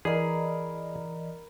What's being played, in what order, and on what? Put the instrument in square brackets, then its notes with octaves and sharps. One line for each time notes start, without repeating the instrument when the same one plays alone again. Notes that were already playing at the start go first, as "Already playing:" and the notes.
[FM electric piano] E3 D5 D#5 [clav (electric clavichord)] G#4 [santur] A#4 B4 B5